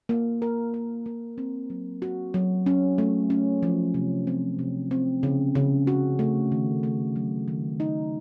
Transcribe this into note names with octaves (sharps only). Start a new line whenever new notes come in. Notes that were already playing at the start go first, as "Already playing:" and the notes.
A#3
A#4
A#4
A#3
C4
F#3
F#4
F#3
C#4
A3
C#4
F3
C3
C4
C3
C4
C#3
C#3
F#4
A3
D#3
A3
F#3
D#3
D#4